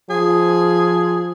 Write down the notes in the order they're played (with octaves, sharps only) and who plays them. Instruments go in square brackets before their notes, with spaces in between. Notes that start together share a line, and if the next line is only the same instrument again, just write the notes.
[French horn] F3 [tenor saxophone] G#4